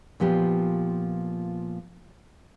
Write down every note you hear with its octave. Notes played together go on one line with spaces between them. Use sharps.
A#2 F3 B3 G4